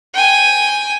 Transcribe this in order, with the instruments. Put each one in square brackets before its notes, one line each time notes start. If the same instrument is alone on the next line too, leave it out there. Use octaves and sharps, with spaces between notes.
[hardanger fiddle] G5 G#5